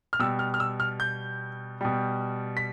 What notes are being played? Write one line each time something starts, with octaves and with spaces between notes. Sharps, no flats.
F6
B2 G3 E6
F6
F6
E6
F6
G6
B2 G3
B6